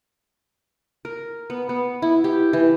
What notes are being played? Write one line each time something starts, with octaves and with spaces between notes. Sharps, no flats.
A#4
B3
B3
E4
G4
E3